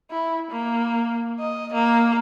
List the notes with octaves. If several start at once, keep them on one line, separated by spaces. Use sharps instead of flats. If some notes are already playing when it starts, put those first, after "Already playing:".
E4
A#3
D#5
A#3